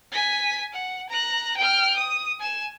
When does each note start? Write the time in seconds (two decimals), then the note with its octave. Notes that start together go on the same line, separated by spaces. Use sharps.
0.12 G#5 B6
0.72 F#5
1.09 A#5 F#6
1.56 G5 F6
1.96 D#6
2.39 G#5 E7